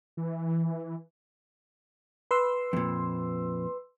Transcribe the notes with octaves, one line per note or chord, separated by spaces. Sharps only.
E3
B4 C6 E6
F2 A#2